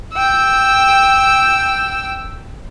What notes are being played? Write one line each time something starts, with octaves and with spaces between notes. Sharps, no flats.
G5 E6